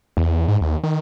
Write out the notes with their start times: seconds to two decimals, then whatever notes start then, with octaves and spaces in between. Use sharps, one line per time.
0.17 E2
0.48 G#2
0.61 D#2
0.83 D#3